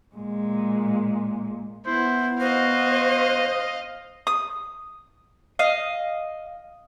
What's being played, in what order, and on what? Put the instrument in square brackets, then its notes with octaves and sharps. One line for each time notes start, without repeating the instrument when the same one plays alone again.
[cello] A#2 G#3
[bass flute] B3 [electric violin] E4 [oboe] C5
[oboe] F#4 [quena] C5 [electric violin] D#5 F5
[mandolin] D#6
D#5 F5